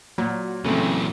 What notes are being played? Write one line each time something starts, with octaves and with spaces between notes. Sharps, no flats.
A#2 F#3
A#2 C#3 E3 A3 C4